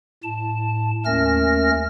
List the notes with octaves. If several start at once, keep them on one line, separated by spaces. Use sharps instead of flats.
A2 A5
D#2 A3 C#4 A#4 F6 A#6